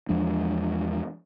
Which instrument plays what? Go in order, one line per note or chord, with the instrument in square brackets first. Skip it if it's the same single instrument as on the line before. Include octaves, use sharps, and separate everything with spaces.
[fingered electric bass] E2 F3 G#3 D4